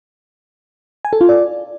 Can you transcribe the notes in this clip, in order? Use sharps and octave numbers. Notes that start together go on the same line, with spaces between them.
G#5
A4
F4
D5